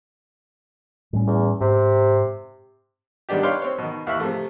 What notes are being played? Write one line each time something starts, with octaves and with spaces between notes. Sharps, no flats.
A2 G3 C#4
E2
G#2 C3
D#3 G3 B3 D4 G4
B4 C#5 D5 F5 G5 C6
C4 C#5
B2 D#3
D#2 E3 E5 C#6 F#6
C3 F3 A3